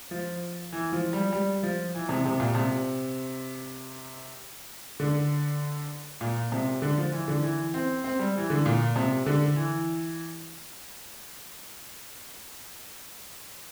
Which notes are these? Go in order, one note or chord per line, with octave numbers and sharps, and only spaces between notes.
F3
E3
F3
G3
G3
F3
E3
C3
C3
A#2
C3
D3
A#2
C3
D3
F3
E3
D3
E3
C4
C4
G3
E3
D3
A#2
C3
D3
E3